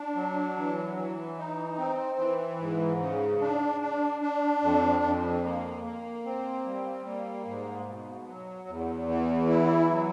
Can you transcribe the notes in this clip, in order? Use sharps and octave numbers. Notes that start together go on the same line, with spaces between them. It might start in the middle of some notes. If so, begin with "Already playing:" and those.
Already playing: D4
F#3
E3
E3
D#4
C4
E3
G#2
C#3
D4
D4
D4
F2
F2
A#3
A#3
C4
G3
A#3
G#2
B2
F#3
E2
E3
E4
F#3